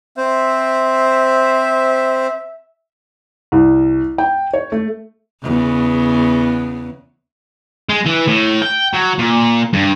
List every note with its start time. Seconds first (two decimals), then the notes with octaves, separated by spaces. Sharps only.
0.17 C4 C5 E5
3.52 C2
4.18 G5
4.53 C#5
4.72 A3
5.43 E2 C#3
7.90 G#3
8.06 E3
8.28 A2
8.62 G5
8.94 F#3
9.19 A#2
9.73 G2